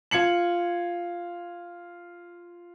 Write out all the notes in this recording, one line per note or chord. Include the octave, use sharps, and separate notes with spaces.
F4 G#6 C#7 F#7